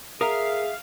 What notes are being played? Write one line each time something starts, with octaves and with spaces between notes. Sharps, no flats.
G#4 A#4 E5 F5 D#6